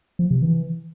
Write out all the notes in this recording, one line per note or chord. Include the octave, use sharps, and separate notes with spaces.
F3
C3
E3